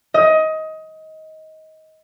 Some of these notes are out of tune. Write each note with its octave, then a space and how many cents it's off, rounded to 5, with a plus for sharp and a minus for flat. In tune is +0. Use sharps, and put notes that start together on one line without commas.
D#5 +20